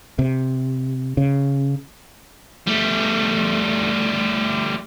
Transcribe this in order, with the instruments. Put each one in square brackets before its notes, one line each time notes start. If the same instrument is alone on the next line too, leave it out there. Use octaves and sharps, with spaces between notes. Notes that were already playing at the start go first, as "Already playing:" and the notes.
[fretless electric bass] C3
C#3
[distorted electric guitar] G3 A3